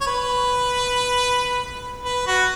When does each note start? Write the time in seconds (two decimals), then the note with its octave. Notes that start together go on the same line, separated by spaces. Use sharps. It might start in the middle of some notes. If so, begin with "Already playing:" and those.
0.01 C#5
0.07 B4
2.05 B4
2.27 F#4